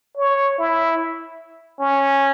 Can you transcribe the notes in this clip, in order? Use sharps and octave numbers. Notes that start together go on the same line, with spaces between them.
C#5
E4
C#4